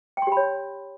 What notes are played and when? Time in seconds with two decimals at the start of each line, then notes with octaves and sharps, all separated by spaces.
0.17 G5
0.22 C6
0.27 G4
0.32 B5
0.37 C#5